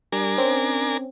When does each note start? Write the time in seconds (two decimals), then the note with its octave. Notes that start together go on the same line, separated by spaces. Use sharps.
0.12 G3 D4 A#4 G#5
0.38 C4 C#4